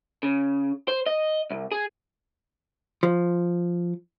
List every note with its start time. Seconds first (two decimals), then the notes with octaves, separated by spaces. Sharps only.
0.23 C#3
0.88 C5
1.06 D#5
1.51 C2
1.72 G#4
3.03 F3